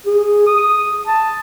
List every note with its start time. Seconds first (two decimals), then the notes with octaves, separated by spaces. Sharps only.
0.06 G#4
0.46 D#6
1.07 A5